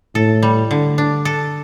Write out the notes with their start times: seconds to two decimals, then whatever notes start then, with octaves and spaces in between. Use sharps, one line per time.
0.15 A2 A4
0.42 G3
0.71 D3
0.98 D4
1.25 A4